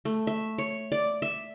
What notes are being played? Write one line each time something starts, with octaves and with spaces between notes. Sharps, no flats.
A3
E5
C#5
D5
E5